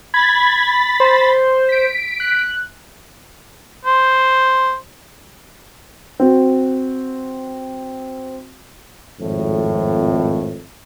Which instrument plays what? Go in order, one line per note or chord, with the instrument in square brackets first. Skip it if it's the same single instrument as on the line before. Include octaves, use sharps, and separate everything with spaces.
[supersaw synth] B5 A6 B6 [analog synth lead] G#6
[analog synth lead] C5
[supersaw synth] B6 D7
[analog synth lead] F#6
[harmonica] C5
[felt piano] C4 F#4
[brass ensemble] G#1 F2 A2